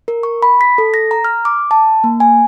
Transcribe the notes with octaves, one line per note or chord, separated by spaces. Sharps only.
A#4
C#6
B5
B6
A4
A#6
A#5
F6
D6
A5
A#3
G#5